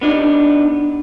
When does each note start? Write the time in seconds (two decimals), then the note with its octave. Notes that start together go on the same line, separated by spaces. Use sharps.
0.01 B3 D4 D#4 G4